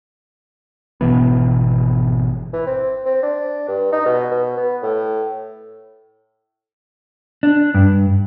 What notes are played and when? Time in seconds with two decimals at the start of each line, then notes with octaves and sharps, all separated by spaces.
1.01 G#1 B2 E3 B3
2.53 E3
2.67 C4
3.06 C4
3.23 D4
3.68 G2
3.92 D#4
4.06 B2
4.31 B2
4.57 B3
4.82 A2
7.43 D4
7.74 G2